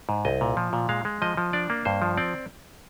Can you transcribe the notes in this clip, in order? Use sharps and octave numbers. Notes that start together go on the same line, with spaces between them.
G#2
C2 D#5
A#2
F3
A#2
G#3 F5
G#3
F3 D#5
F3
D4 D5
A#3
G2 C5
F3
C4 D5